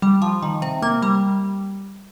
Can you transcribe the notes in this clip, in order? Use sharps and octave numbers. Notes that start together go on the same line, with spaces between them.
G3
F3
D#3
C3
A#3
G3